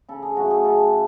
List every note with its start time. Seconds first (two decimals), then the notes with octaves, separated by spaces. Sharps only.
0.09 C#3 A4
0.22 G#4
0.37 F#3 A3 F#4
0.51 G#4
0.65 C#3 A4